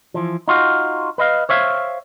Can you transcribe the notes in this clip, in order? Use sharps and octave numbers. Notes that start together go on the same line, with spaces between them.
E3 F3
D#4 F4 F#4
B4 D#5 F5
C5 C#5 E5 F5